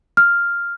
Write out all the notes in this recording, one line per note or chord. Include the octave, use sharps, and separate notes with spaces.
F6